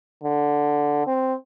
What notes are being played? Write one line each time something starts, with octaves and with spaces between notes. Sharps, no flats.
D3
C4